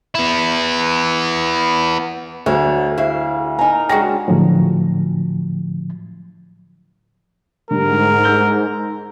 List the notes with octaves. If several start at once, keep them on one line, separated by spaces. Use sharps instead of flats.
B3 E4
D2 D3 F#3 G#4 C5 C#5
E4 G4 G#4 C5 F5
D#4 A#4 G#5
C#3 G#3 D4 F#4 G5 A#6
A2 D3 F3 F#3
G#2 D3 G3 A3 A#4
E6 G6 G7